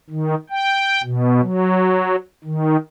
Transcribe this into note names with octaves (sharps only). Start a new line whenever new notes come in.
D#3
G5
B2
F#3
D#3